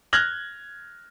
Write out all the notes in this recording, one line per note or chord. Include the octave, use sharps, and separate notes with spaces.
F6 F#6 G#6 A#6 F#7 G7